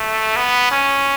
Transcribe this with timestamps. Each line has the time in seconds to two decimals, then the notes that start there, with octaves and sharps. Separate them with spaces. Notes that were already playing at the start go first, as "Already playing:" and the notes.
Already playing: A3
0.36 B3
0.71 C#4